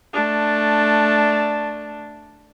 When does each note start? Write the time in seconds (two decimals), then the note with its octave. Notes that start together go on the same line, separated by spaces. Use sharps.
0.13 A3 D4